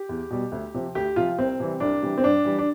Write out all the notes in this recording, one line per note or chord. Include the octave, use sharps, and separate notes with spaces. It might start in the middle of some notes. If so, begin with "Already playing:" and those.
Already playing: G4
E2
B2 G3
D2
C3 F3
D2 G4
C3 F3 F4
C2 C4
C3 E3 G3
C2 D4
C3 E3 G3
C4
G2 D4
E3 G3
D4